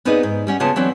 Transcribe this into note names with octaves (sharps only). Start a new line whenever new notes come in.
B3 C4 D4 D#4 G#4 B4
G#2
G3 C#4 F#5
C#3 A#3 B3 F4 A5
E3 F#3 C4 D4